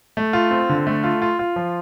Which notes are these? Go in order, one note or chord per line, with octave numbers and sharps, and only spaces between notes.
A3
F4
C4
D3
A3
F4
F4
F4
F3